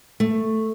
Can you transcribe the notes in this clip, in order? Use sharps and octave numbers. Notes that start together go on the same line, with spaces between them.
A3